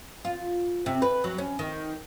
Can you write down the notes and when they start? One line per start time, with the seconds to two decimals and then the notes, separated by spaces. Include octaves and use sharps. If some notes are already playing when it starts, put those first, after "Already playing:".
0.25 F4
0.86 C3
1.02 B4
1.24 F#3
1.38 C#4
1.59 D#3